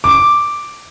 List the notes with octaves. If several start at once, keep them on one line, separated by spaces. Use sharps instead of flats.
D6